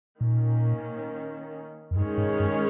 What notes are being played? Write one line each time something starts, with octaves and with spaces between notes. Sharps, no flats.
A#2 D#3 A#3 C#4
F2
G2 D#3 G#3 C#4 G#4 C#5
G#2
G2